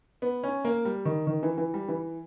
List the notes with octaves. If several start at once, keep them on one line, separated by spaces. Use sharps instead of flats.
B3
C#4
A#3
G3
D#3
D#3
E3
E3
G3
E3